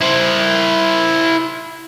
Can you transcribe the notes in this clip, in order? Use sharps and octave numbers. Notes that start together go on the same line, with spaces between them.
E4 C5